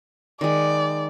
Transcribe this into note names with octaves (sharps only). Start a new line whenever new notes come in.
D#3 G#3 D5